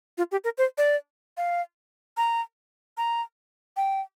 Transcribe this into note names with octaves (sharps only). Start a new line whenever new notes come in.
F4
G4
A#4
C5
D5
F5
A#5
A#5
G5